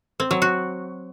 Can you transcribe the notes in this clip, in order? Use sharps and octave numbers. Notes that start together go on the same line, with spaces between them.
C4
F#3
F#4